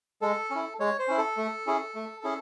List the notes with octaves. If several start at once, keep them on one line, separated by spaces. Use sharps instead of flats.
G#3 A4
C#4 E4
G#3 C#5
C5
C#4 E4
A4
A3
C#4 E4 G#4
A3
C#4 E4 G#4